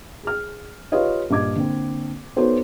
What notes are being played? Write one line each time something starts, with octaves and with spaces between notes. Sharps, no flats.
G#4 F6
F4 G4 B4 C#5 D#5 F5
G2 A#2 D#5 D6 G#6
D3 A#3 C4
B3 D#4 F#4 A4 C5 C#5